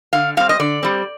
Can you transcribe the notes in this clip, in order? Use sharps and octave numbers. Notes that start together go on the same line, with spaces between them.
D3 F5
G3 C4 F5
D#5
D3 D5
G3 C4